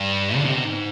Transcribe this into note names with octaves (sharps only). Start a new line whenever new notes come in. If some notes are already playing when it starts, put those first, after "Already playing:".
Already playing: G2
D3
C3
B2
G#2